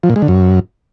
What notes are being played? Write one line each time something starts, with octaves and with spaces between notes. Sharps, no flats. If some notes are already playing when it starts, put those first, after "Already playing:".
F3
A#2
G#3
D3
F#2